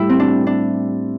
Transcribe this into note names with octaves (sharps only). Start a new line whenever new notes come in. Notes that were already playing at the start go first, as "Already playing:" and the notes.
Already playing: A2 G3 E4 G4
C4
D4
D4